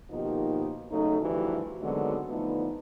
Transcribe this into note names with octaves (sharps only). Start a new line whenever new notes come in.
B2 D#3 F3 A#3 D#4 G4
C#3 F#3 A3 D#4
D2 G2 E3 F3 F#4 G4
D3 D#3 F#3 G#3 B3 C4
D3 E3 F3 A3 B3 D#4